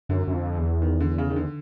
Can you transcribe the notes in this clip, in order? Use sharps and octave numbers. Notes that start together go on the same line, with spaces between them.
F#2 D3
F#2
F2
E2
D#3
D3
C#3
D#3
D3